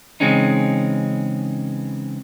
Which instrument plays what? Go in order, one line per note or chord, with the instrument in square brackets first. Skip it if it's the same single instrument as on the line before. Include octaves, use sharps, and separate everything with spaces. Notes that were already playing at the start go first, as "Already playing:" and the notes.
[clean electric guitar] C#3 E3 G#3 C4 C#4 D#4